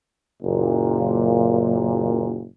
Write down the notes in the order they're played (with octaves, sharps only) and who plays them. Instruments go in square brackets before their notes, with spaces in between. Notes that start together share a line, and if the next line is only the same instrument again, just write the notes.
[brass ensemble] F#1 A#2